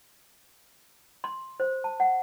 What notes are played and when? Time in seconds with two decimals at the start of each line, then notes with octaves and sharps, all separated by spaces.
1.24 C6
1.60 C5
1.84 A5
2.00 F#5